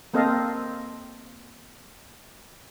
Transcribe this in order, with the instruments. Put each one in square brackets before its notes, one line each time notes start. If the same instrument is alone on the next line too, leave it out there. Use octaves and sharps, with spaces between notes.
[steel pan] A#3 C4 A4 D#5 F5